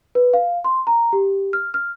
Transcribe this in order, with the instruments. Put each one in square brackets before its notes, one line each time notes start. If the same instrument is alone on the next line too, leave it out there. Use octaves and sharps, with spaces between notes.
[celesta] B4
F5
C6
A#5
G4
F6
F6